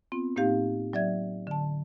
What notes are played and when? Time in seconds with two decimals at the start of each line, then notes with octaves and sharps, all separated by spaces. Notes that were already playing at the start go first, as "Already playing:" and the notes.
0.12 B3 C4 F4
0.36 A2 A#3 C4 D#4 G4 F5
0.93 F#3 D5 E5 G#6
1.47 D3 A5